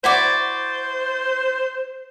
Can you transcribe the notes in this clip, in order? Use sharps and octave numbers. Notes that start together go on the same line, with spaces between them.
E4 F#4 C5 D5